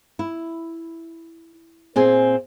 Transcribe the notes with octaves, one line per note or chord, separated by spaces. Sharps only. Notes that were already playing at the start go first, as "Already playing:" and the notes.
E4
A#2 C4 G#4 G#5